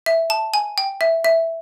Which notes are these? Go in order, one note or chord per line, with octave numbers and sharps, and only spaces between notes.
E5
A5
G#5
G5
E5
E5